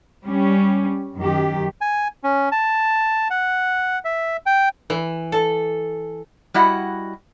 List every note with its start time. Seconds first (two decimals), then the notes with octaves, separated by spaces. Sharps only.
0.24 G3 C#4
1.17 F#2 D#3 G4
1.81 G#5
2.24 C#4
2.52 A5
3.30 F#5
4.05 E5
4.46 G5
4.90 E3
5.32 A4
6.54 G3 E4 F#4 D#5 F#5